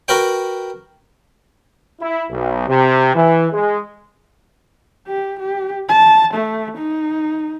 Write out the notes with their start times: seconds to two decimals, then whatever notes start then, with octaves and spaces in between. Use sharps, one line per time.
0.08 F#4 A#4 B4 G5
2.01 E4
2.31 B1
2.67 C3
3.14 E3
3.53 G#3
5.07 G4
5.40 G4
5.89 A5
6.34 A3
6.77 D#4